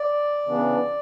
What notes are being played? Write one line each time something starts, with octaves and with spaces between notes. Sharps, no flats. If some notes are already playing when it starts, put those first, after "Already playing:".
Already playing: D5
C#3 E3 B3 D4